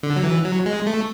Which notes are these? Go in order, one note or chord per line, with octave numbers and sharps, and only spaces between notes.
D3
F#3
E3
F#3
G#3
A3